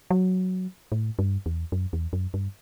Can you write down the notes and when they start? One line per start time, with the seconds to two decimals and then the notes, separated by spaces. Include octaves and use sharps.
0.11 F#3
0.92 A2
1.19 G2
1.46 E2
1.72 F#2
1.93 E2
2.13 F#2
2.34 G2